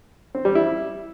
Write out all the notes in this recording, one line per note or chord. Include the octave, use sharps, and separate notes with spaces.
C4
G3
E4